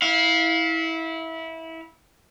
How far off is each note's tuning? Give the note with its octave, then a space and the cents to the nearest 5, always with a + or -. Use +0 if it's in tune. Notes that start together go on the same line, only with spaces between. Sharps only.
E4 -20 F5 +10